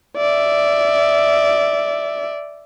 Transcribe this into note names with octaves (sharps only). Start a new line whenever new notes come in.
D5 E5